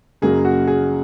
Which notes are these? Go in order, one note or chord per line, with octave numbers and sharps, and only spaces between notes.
F#1 F#2 C#3 F#3 A#3 G#4
F#4
G#4